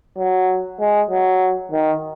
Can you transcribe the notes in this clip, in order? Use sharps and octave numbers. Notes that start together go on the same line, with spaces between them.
F#3
G#3
F#3
D#3